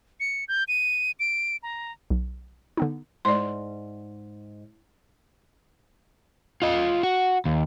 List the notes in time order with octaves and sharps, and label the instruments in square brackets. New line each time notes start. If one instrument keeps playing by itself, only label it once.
[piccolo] C#7
G6
D#7
D7
A#5
[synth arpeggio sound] B1
D3 B3 D#4
[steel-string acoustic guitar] G#2 [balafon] D5 C6
[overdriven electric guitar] F4 D#5
F#4
D#2